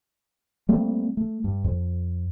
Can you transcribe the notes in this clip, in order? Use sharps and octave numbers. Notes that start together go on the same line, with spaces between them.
G3 A3 A#3 C4
A3
G2
F2